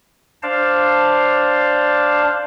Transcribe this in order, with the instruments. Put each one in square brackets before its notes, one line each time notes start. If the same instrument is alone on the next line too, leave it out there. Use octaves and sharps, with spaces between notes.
[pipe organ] D4 C5 D5 F5 A5